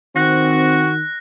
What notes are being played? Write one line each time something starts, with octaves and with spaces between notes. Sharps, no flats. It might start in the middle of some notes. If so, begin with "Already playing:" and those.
D#3 C4 F#4 F#6 A#6